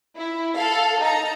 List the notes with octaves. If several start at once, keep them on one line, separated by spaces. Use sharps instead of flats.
E4
A4 F5
D#4 A5 A#5